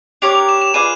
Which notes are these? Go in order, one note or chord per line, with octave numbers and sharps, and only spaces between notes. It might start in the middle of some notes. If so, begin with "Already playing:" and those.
D4 G4 A#4 C#5 F7
F7
E7
E7
F4 G#4 B4 D5 D#7